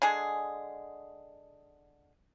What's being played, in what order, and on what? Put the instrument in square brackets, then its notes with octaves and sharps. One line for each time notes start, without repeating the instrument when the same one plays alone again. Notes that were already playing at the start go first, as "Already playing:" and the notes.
[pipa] D3 G#3 G#4